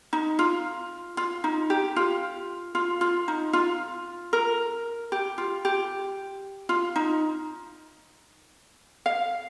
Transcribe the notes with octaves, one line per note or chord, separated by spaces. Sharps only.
D#4
F4
F4
D#4
G4
F4
F4
F4
D#4
F4
A#4
G4
F4
G4
F4
D#4
F5